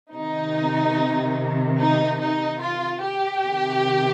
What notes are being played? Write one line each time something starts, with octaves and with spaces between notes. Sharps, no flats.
C3 D#3 D#4
D#4
D#4
F4
G4
C3 D#3